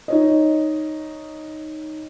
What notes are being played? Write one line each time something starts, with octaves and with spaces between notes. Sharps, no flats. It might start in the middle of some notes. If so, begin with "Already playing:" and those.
D#4 C#5 D#5